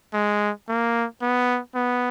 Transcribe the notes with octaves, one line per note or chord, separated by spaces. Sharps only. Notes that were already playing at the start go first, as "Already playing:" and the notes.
G#3
A#3
B3
B3